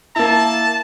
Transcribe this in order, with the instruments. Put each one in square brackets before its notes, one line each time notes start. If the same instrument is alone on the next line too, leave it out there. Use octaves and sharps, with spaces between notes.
[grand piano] A#3 E4 [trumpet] A5